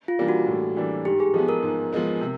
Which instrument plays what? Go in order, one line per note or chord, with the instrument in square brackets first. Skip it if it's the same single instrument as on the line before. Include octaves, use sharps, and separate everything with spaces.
[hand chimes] F4
[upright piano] E3 G3 A#3 D4
[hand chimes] F#4
[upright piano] A2
E3 G3 A#3 D4
[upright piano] G#2 [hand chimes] G4
[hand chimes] G#4
[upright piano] F3 G#3 B3 [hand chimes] A4
[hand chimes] A#4
[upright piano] G#2
F3 G#3 B3
C3